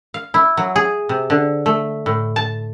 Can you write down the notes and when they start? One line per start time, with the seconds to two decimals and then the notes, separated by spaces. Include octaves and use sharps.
0.14 F5
0.34 E4
0.57 F#3
0.76 G#4
1.09 C3
1.30 D3
1.66 A3
2.06 A2
2.36 A5